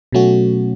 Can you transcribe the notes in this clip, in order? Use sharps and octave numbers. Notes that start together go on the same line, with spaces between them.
B2 F#3 A3 C#4 F#4